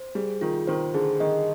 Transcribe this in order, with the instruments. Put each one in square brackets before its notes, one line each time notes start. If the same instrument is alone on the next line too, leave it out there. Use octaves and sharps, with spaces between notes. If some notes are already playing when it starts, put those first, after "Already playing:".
Already playing: [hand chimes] C5
[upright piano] G3 [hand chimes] G#4
[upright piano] D#3 [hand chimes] F4
[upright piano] D#3 [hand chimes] C5
[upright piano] D3 [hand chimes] G#4
[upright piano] D#3 [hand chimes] D#5